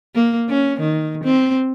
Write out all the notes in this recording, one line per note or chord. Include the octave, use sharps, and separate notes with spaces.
A#3
C#4
D#3
C4